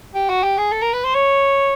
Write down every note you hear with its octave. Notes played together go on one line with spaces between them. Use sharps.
G4
F#4
G4
G#4
A4
A#4
B4
C5
C#5